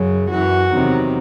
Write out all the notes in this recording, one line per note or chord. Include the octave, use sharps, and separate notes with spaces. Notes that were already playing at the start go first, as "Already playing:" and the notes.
Already playing: F#2 C#3 F#3
F#2 E3 F#4
E2 C3 D#3 F#3